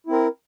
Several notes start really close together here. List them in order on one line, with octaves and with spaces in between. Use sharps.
E4 C4 A#4